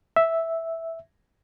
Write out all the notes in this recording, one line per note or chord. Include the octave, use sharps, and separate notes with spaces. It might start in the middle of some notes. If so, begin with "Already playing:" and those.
E5